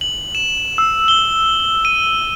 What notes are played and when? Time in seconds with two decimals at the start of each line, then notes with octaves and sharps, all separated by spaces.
0.01 F#7
0.35 E7
0.78 E6
1.08 G7
1.85 D#7